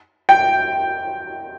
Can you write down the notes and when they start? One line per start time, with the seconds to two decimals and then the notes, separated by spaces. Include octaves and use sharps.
0.29 G5